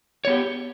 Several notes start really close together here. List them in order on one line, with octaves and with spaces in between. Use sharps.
C#5 B3 G4